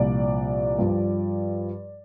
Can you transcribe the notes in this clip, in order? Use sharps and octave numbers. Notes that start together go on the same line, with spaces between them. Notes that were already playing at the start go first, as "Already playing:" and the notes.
Already playing: C2 A#2 F3 D5
G2 F3